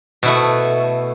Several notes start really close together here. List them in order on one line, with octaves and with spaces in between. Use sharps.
B2 E4 A3